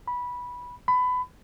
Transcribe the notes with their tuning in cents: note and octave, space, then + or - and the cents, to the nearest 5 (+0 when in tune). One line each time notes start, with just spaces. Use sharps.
B5 -10
B5 +25